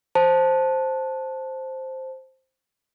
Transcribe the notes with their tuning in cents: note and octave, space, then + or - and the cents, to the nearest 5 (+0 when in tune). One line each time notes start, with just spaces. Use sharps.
C5 +5 A5 -5